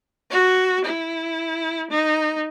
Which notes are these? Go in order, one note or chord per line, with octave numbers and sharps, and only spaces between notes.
F#4
E4
D#4